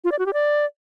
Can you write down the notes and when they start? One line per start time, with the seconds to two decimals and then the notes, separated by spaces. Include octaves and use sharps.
0.04 F4
0.12 D5
0.19 F#4
0.26 G4
0.33 D5